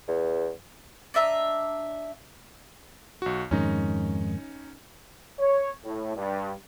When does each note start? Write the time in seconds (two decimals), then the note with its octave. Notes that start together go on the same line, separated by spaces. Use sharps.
0.08 E2
1.14 D4 D#5 E5 A#5
3.22 B1 F#4
3.51 F2 G#2 D#3 C#4 D#4
5.39 C#5
5.84 A2
6.16 G2